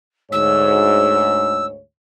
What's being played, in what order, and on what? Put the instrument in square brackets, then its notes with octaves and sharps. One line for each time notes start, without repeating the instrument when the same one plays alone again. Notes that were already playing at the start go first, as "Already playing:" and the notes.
[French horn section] D2 G#2 C#5 [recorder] E6